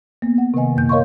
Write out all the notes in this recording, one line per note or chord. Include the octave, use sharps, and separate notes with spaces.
A#3 B3
F#5
C3 D#3 B4 D#5 G#5
F#2 A#2 A#3 G6
A#4 C#5 D#5 F5 C6 C#6